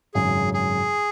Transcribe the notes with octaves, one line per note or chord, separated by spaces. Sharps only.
G#1 F#2 C#3 G#4
G#4